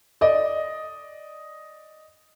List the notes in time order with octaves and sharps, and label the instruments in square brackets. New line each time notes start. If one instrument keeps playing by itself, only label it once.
[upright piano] D5 D#5